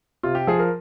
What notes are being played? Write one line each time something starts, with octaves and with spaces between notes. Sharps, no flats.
C3 F4
G4
F3 G#4
A#4